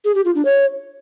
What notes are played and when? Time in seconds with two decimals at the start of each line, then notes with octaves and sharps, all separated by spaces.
0.05 G#4
0.15 G4
0.25 F4
0.35 D4
0.45 C#5